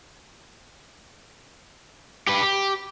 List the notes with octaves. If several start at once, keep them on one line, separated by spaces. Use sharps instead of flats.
G4 B4
G4